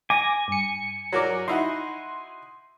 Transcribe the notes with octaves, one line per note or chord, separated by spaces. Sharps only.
G#5 D6 A#6
G2 C#7
F#3 A#4 D5
D#4 E4 F#4 C6